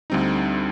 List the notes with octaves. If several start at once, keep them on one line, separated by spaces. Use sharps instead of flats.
D2 D3 G3 C4 D#4